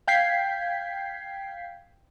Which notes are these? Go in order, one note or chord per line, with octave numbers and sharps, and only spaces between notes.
F5 G5 G6 G#6 B6 C7